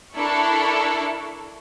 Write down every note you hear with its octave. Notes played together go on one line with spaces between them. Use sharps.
D4 E4 A4 A#4 B5 C#6